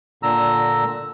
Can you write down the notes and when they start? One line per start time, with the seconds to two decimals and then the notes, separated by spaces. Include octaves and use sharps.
0.23 A#2 D3 A#5 E6